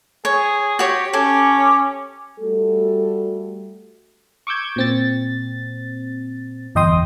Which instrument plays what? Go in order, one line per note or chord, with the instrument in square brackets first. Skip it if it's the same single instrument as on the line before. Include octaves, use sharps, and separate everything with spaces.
[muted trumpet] G#4 [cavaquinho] C#5
[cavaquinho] F#4 C#5 [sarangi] G4
[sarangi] C#4 [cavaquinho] A4 G#5 [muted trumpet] C#5 [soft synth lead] D6
[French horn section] G3 A3 F#4 A4
[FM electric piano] C#6 D6 E6 G6 G#6
A#2 C4 A6
G1 E2 D#5 G5 C6 D#6